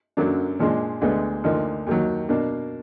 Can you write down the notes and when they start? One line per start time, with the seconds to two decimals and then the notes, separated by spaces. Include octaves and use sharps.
0.17 F#2 D3 F#3 A#3 D4
0.59 A#2 F3 G#3 D4
1.01 D2 D3 G#3 B3
1.44 D2 D3 F3 A#3 D#4
1.87 D#2 D#3 F#3
2.29 B2 A#3 D4